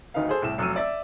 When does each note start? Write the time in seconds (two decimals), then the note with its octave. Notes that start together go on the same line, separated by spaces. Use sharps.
0.14 D2 D#3 D#4 B4 F5
0.29 G#4 A4 C5
0.42 C2 A2 E7
0.58 F1 F#3 E6 F6 D#7
0.76 D5 E5 E6